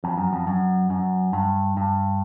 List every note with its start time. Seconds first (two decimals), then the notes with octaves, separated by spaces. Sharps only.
0.04 F2
0.18 F#2
0.33 F2
0.47 F#2
0.90 F#2
1.33 G2
1.77 G2